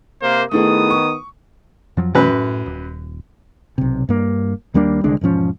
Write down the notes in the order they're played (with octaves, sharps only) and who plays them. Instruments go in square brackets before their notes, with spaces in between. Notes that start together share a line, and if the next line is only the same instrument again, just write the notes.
[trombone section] C3 A#3 [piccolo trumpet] C5
[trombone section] D#3 B3 [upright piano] A3 E4 G#4 [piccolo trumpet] D#6
[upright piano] C#6
[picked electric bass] F2 F3 F#3
[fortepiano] F#2 B4 [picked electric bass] B2 E3 A3
[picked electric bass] A2
D#1
[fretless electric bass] B1 C3
G2 A#3
D#2 G3 A#3 D4
C2 D3 G#3 D4
E1 G#2 F3 C#4